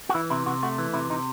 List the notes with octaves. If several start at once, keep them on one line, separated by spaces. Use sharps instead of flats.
F#4
E3 E4
C3 E4
C3 F#4
A3 F#4
E3
C3 E4
C3 D#4